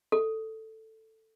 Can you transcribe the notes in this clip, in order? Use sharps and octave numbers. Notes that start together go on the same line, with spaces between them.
A4